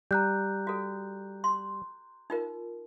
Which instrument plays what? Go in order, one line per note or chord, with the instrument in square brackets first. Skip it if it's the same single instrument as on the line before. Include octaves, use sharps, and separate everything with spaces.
[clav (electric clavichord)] G3 [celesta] A#5 F#6 G6
[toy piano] F#4 A4
C6
D#4 F4 A#4